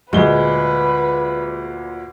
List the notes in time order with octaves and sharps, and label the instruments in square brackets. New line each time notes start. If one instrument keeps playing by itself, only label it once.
[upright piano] D2 A#2 G7 [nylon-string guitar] G#3 [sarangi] B4